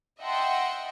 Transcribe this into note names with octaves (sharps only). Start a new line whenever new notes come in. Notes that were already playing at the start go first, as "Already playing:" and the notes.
D#5 E5 F#5 G5 A5 C6